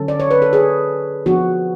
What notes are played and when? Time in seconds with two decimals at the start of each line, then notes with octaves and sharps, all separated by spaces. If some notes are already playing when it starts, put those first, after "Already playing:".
Already playing: D3 F#3 C#4 A4
0.08 D5
0.20 C#5
0.31 B4
0.42 A4
0.53 G#4
1.26 F3 B3 D4 F#4